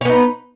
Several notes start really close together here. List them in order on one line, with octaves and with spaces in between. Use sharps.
C#5 B3 D#4